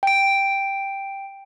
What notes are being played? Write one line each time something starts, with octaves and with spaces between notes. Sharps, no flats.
G5 D7